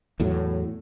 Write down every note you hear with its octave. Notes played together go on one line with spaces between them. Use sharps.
E2 A2 F#3